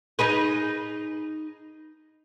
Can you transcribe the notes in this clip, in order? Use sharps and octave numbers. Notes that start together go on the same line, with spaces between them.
D#4 G#4 B4